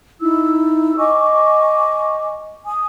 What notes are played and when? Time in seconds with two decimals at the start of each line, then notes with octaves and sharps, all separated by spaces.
0.20 D#4 E4 E6
0.98 D#5 G#5 C#6 D6
2.65 G#5 D#6